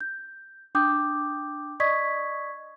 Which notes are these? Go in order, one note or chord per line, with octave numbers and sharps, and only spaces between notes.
G6
D4 G5 D6 D#6 G6
D5 D#5 C#6 D#6 G#6 B6